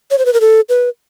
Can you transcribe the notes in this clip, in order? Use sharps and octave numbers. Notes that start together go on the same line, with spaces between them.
C#5
C5
B4
A#4
A4
B4